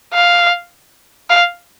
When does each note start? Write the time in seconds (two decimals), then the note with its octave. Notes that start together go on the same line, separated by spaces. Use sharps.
0.13 F5
1.30 F5